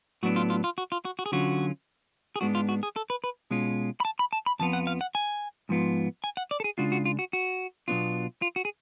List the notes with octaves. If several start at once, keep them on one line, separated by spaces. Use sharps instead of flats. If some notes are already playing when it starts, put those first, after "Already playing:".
A2 F#3 B3 D4 F#4
F4
F4
F4
F#4
F4
F#4
F#4
G#4
D3 F#3 C#4 F4 F#4
G#4
G#2 G#3 B3 D4 F#4
F4
F#4
G#4
A4
B4
B4
B2 G#3 C#4 F4
B5
A5
B5
A5
B5
F2 F3 B3 F4 A5
F#5
F5
F#5
G#5
G#2 F3 B3 F4
G#5
F#5
D5
A4
G#4
C#3 G#3 D4 F4 F#4
F#4
F4
F#4
F#4
B2 F#3 B3 D4 F4
F4
F#4
G#4